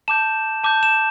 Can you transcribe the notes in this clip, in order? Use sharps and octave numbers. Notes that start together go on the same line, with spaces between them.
A5 D6 G6 E7
A5 D6 G6
E7